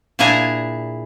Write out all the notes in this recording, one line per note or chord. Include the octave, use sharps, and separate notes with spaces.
A#2 D4 E4 G#4 G#5 A#5